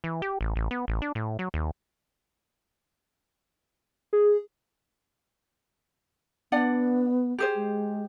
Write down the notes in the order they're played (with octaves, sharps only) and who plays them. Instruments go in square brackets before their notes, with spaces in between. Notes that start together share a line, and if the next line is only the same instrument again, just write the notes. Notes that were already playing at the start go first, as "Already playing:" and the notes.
[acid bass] E3
G4
A1
A1
B3
A1
D4
A2
F#3
D#2
[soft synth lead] G#4
[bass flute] B3 [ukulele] D4 D5 F#5
[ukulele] G4 G#4 C5
[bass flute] G#3